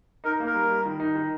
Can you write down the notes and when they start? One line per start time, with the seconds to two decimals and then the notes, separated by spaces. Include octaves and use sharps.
0.24 D#4 A#4
0.40 A#3
0.47 A#4
0.54 G3
0.69 G3
0.85 D#3
1.00 D#4
1.15 D#3